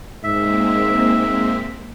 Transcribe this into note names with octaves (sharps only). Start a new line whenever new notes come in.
G#2 G#3 A#3 C4 E5